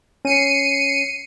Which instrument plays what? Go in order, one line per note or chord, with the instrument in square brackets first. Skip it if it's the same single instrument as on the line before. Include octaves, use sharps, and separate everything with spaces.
[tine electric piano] C#4 [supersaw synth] C7 C#7 D#7